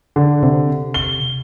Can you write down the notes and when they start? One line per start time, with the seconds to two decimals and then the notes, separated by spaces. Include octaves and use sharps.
0.16 D3
0.43 C3
0.94 G7